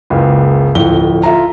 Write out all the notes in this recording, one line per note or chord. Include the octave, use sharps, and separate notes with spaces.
F#1 C#2
D1 F2 G7
F4 E5 A#5